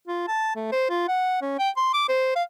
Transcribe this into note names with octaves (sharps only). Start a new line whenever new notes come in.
F4
A5
A3
C5
F4
F#5
C#4
G5
C6
D6
C5
F5